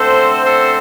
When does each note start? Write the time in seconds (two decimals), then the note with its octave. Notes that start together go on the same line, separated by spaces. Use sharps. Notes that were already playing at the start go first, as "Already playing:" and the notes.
Already playing: D3 A3 C4 A4 C5
0.46 A4 C5